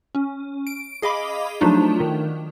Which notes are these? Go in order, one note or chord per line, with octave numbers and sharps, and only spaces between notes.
C#4
D7
G#4 D#5 F5 B5 D6
F3 F#3 A3 D4 D#4 F4
D#3